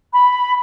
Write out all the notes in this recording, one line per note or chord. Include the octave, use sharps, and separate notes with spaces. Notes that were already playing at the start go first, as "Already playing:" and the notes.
B5